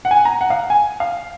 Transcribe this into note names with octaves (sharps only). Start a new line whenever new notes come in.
F#5
G#5
A#5
F#5
F5
G#5
F5